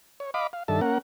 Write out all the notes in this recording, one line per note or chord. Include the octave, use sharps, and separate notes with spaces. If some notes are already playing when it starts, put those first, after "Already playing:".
C#5
D#5 F5 B5 D6
F5
G2 D#3 D4 A4 E5 A5
A#3 C#4 A#4 F#5